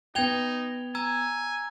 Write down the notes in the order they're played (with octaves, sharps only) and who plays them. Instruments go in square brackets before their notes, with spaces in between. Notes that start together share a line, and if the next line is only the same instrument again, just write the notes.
[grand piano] B3 G5 [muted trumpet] D#4 [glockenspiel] G#6 F7 G7
[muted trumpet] G#5 [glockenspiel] A#5 E6 G#6